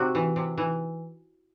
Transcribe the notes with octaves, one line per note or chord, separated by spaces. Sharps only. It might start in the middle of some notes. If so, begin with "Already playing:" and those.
Already playing: C3 F#4
E3
C3
E3